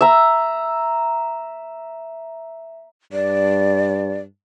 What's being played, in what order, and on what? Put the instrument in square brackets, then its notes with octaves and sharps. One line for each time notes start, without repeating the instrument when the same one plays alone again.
[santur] E5 A#5
[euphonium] G2 [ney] D5